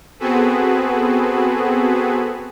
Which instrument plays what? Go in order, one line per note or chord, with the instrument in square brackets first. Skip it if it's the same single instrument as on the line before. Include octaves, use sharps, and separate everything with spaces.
[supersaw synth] B3 C4 F#4 G#4 A4 B4